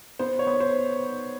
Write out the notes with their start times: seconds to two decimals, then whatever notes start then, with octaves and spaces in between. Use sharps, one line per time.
0.19 B3 C5
0.39 C#5
0.47 B3
0.60 C5